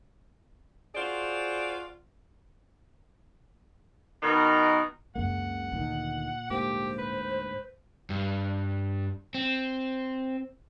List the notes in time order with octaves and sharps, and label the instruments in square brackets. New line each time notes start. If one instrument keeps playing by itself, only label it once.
[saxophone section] F4 F#4 G#4 C5 D5
[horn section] B2 D#3 D#4 A#4
[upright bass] G#1 F#2 [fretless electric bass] C#2 C#3 A#3 [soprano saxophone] F#5
[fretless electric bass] D2 D#3 [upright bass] A#2
[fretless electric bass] D2 G#2 A#3 [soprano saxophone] G4 [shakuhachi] C5
[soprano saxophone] B4
[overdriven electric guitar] G2
C4